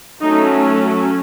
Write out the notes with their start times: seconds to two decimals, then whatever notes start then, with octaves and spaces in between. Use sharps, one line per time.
0.21 F#3 A3 C#4 D#4